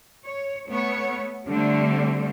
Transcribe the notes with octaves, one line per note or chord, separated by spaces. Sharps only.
C#5
A3 B3 C#5
D3 G3 A3 C4